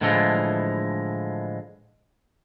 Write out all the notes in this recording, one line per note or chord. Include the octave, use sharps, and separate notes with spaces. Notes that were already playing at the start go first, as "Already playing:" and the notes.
A2 D3 E3 F3 G#3